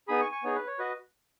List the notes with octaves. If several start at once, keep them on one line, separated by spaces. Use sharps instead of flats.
B3 D#4 G#4 B5 D#6
G#5 C#6
G#5 C#6
B3 D#4 G#4 C#5
B4
C#5
F#4 B4 D#5